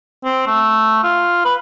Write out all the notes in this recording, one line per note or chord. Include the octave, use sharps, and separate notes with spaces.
C4
A3
F4
B4